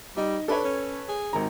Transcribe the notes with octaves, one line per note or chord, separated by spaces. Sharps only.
G3 D#4 D#5
D4 A4 B4 C#5
C#4
G#4
G#1 D#3 A#5